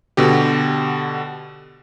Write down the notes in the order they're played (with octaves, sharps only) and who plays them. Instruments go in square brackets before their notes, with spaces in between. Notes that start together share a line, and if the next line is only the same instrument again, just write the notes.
[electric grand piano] B2 D3 G4